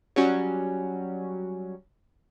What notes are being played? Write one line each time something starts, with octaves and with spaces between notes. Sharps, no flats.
F#3 G3 C#4 F#4